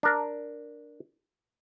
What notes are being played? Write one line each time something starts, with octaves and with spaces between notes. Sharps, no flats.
D4 A#4